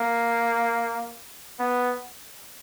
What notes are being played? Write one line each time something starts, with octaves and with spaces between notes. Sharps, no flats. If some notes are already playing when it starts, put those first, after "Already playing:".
Already playing: A#3
B3